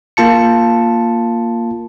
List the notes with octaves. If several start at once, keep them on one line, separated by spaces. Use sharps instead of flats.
A#3 F4 A5 C#7